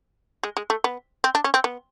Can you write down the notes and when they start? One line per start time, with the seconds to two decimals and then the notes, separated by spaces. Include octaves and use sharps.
0.43 G#3
0.57 G#3
0.70 A3
0.84 B3
1.24 C4
1.35 D4
1.44 C#4
1.54 C4
1.64 B3